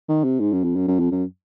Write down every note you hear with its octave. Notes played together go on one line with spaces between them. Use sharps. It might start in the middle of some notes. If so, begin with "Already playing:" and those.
D#3
C3
G#2
F#2
F2
F#2
F#2
F2
F#2